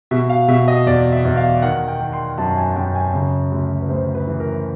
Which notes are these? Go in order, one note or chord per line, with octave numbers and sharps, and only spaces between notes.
B2 E5
F5
B2 E5
D#5
E2 D5
E5
E2
F5
D#3 F#5
G5
D#3
C6
F#2 A5
G#5
F#2 G5
G#5
C#3
D2
B4
D2 C5
B4
E3
A#4